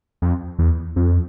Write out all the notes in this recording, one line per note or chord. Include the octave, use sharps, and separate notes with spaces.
F2
E2
F2